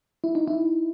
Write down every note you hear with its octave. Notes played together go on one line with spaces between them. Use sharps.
E4
D#4
E4